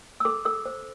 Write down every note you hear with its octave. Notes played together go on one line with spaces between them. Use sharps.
E6
A4 D6
A4 E6
C5